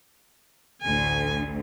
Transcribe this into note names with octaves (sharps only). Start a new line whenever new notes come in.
A1 D2 G#5